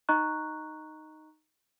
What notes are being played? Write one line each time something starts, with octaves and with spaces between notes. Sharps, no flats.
D#4 D#5 A#5 C#6 F#6